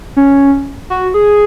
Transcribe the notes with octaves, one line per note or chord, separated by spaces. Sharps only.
C#4
F#4
G#4